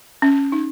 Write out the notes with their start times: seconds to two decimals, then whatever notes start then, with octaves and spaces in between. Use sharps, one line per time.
0.22 C#4
0.52 D#4